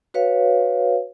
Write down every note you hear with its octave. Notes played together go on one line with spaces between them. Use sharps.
F#4 B4 C#5 F5